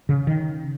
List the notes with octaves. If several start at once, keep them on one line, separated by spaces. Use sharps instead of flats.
C#3
D#3